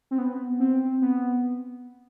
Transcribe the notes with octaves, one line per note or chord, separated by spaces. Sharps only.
C4
B3
C4
B3